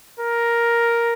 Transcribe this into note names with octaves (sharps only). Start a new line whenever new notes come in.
A#4